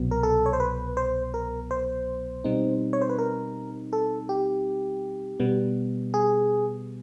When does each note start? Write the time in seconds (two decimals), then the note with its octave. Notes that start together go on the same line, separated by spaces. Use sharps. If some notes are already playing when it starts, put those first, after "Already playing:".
Already playing: C2 B2 F#3 B3
0.11 A#4
0.23 A4
0.46 C#5
0.53 C5
0.60 B4
0.97 C5
1.34 A#4
1.71 C5
2.44 B2 G3 C4 D#4
2.93 C#5
3.02 C5
3.09 B4
3.18 A#4
3.93 A4
4.29 G4
5.40 B2 G3 B3
6.14 G#4